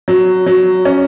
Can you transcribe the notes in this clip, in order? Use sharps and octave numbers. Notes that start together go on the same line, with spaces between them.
F#3
F#3
C#4